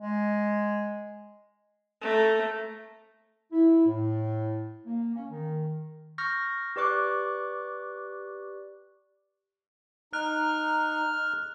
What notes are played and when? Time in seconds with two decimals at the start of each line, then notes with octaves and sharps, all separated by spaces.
0.01 G#3
2.01 A3 A#5
3.52 E4
3.87 A2
4.86 A#3
5.15 C#4
5.31 D#3
6.18 C#6 F6 G6 A#6
6.76 G4 B4 D5 C#6 D6 F#6
10.13 D#4 F6 F#6